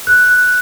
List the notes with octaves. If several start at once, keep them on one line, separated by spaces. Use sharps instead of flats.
F#6